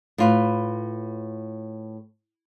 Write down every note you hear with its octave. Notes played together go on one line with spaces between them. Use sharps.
A2 F4 B4